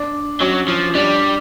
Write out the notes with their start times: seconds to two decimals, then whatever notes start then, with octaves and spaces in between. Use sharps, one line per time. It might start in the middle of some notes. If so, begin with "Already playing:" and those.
Already playing: D4
0.41 F#3 C#4
0.68 F3
0.95 G3 D4